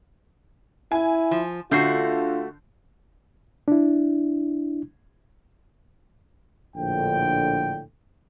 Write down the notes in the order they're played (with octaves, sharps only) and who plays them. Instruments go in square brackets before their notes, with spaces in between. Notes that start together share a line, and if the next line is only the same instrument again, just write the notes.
[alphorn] E4 [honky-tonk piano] G#5
[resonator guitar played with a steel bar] F3
[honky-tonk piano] D3 G6 C7 [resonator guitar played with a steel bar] A3 F#4 [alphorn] F4
[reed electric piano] D4 E4
[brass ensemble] A#1 A2 D3 G5